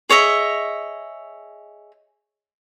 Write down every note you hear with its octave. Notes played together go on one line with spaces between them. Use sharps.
G#4 C#5 D#5 E5